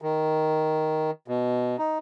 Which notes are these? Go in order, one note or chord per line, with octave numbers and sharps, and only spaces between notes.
D#3
B2
D#4